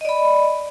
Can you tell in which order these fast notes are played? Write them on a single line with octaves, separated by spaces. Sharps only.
D#5 D5 B5